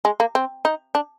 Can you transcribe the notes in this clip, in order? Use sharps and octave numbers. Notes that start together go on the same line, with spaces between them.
G#3
A#3
C4
D#4
D4